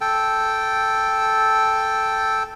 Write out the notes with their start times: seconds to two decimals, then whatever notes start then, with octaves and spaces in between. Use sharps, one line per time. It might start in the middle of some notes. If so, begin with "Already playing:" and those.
0.01 A4 G5